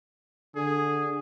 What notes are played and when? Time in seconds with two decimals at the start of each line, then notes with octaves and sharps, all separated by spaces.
0.56 D3 G#4